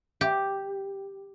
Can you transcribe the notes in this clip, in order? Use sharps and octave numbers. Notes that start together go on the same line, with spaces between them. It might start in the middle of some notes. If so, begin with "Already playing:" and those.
G4